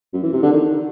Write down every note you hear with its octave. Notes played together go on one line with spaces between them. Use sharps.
F#2
E3
C3
D3
D#3